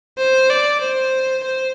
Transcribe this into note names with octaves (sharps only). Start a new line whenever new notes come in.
C5
D5
C5
C5